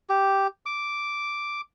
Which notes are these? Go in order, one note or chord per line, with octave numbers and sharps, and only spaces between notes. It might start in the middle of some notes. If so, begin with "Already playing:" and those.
G4
D6